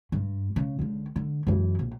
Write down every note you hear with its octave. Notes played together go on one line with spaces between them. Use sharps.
G2
C#3
C#2 D3
D3
F#2 E3
A#1